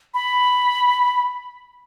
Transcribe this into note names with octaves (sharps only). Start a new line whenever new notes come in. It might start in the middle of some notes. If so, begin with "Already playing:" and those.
B5